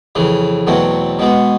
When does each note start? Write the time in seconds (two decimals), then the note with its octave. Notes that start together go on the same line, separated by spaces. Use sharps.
0.15 F2 C#3 E3
0.67 E2 B2 F#3 A3 C4
1.19 B2 G#3 B3